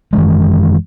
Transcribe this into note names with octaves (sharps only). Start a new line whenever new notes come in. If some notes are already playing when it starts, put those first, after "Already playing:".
F#2 D#3 E3 G#3